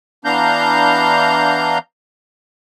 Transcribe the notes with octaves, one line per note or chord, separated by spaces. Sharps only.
E3 B3 D4 F5 A#5 G6